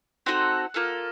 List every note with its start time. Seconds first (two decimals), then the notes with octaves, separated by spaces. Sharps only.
0.26 C4 D#4 F#4 A4 F#5
0.74 A#3 F4 A4